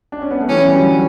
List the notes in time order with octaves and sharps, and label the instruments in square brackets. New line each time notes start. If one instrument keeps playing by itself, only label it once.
[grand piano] D4
C#4
B3
A3
[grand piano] E3 G3 [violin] C#4
[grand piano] D3 F#3